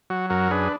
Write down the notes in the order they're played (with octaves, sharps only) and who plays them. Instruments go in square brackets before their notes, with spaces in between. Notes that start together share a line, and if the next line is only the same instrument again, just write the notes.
[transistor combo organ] F#3 F#4
F#2 F#4 A#4
D4 G#4 B4